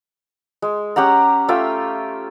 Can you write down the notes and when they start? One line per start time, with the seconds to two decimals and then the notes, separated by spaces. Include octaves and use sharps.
0.62 G#3
0.96 C#4 G4 F#5 A#5
1.48 A3 F4 E5 G5